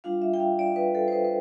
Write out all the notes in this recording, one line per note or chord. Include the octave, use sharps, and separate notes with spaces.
G3 D4 F4 F5
E5
G5
F5
D5
B4
A4
C5
B4
B4